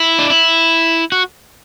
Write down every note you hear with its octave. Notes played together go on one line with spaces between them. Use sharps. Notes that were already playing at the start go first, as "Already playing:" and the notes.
Already playing: E4
D4
E4
F#4